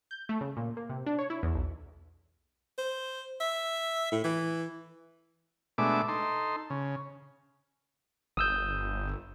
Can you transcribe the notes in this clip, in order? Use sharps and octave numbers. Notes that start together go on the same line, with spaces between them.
G6
A3
C#3
A#2
A#3
C3
D4
C#5
E4
E2
B1
C5
E5
A2
E3
B2 G#3 A3 D4 E5 D6
D#4 A4 C6
C#3
G1 D#6 E6 G6